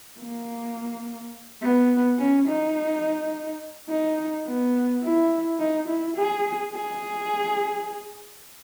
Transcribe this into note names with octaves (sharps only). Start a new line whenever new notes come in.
A#3
B3
C#4
D#4
D#4
B3
E4
D#4
E4
G#4
G#4